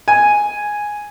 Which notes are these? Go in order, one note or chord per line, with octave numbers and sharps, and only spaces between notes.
G#5